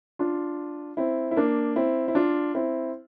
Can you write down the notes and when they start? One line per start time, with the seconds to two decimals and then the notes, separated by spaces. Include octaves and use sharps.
0.19 D4 F4
0.97 C4 E4
1.31 E4
1.37 A#3 D4
1.76 C4 E4
2.08 E4
2.15 D4 F4
2.55 C4 E4